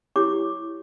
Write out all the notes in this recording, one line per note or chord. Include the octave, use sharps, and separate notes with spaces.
E4 G4 C#5 D6